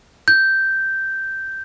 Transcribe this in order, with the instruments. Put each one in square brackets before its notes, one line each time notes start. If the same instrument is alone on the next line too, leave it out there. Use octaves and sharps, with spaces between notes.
[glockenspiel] G6